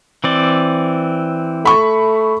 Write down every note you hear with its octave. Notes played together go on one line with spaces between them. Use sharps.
E3 C4 D5
A3 B5 C#6